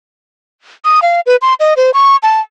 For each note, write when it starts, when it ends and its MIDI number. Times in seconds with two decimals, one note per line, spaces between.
0.85 1.00 87
1.02 1.21 77
1.26 1.36 71
1.42 1.54 84
1.60 1.74 75
1.77 1.91 72
1.94 2.17 85
2.23 2.40 81